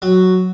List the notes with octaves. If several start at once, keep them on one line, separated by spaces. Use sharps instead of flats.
F#3